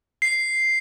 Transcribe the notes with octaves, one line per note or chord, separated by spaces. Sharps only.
C7